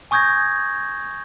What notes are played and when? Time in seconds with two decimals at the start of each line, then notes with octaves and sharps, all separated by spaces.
0.11 G#5 C#6 D#6 G6 G#6 A#6